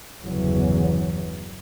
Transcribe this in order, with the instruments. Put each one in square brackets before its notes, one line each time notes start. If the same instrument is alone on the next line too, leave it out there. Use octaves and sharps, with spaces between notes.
[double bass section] G1 E2 C#3 E3 F#3